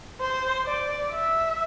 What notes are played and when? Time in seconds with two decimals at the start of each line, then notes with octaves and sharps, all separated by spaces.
0.21 C5
0.66 D5
1.11 E5